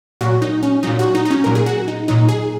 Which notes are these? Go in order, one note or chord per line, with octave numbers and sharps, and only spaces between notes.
A#2 F#3 F#4
D#4
C#4
A#2 F#3 D#4
F#4
D#4
D#4
C#4
A#2 F#3 A#4
G#4
F#4
D#4
A#2 F#3 D#4
G#4